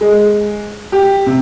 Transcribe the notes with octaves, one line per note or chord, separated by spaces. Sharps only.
G#3
G4
C3